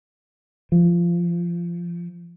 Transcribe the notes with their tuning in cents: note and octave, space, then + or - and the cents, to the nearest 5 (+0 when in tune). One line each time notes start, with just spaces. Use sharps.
F3 -20